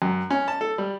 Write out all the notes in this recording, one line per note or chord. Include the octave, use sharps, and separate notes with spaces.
F#2
C#4
A5
A4
G3